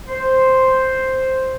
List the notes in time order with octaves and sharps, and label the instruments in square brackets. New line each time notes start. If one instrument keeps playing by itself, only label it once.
[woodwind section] C5